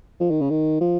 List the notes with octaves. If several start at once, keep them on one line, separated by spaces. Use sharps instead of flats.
F3
D#3
C#3
D#3
F3